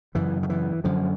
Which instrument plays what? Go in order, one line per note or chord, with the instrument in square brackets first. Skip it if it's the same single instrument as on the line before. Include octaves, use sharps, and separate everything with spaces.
[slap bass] F#2 C#3 E3
D#3
E3
F#2 D3 F3